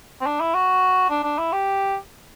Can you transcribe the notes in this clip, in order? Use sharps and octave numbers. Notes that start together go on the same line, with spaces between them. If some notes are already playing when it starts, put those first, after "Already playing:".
C4
D4
E4
F#4
D4
D4
E4
G4